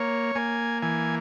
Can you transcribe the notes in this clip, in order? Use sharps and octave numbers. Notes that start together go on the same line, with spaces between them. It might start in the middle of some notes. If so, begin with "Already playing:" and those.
Already playing: A#3 C#5
A#3 G#5
E3 G#5